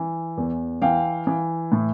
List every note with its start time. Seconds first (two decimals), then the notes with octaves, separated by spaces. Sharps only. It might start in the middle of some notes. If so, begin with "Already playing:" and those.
Already playing: E3
0.37 E2
0.82 E3 F5 G5
1.27 E3
1.72 A2